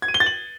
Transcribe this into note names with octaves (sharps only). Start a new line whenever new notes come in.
G#6
D#7
G7
A6
F#7